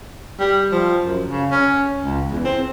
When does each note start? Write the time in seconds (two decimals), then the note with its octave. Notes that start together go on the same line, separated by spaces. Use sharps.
0.40 G3
0.72 F3
1.05 F#2
1.30 C#3
1.51 C#4
2.03 C#2
2.32 E2
2.45 C4